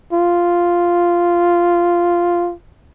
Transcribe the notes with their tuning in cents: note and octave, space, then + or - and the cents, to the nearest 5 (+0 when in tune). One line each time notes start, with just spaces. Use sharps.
F4 -5